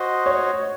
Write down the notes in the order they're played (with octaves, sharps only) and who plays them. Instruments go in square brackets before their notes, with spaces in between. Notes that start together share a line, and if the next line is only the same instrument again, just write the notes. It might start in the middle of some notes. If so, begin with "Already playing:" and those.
Already playing: [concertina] F#4 C5 D#5
[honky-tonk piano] C#5